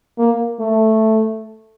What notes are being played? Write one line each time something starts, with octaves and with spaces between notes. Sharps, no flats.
A#3
A3